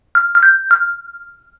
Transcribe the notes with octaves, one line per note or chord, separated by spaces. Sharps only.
F6
F6
G6
F6